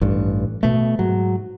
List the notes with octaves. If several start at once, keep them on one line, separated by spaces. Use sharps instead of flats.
A1 G2
B2 A3
G#2 F#3